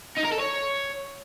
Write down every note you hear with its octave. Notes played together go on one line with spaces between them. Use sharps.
D#4
A#4
A4
C#5